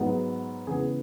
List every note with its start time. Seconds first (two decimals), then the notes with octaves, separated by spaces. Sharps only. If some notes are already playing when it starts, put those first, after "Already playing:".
Already playing: G#2 F#3 B3
0.67 C#3 E3 B3 G#4